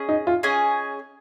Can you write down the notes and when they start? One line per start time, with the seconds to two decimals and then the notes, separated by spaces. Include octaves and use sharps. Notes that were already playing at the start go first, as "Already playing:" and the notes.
Already playing: C#4 G#4 D#5
0.09 D#4
0.27 F4
0.43 C#4 G#4 D#5 G#5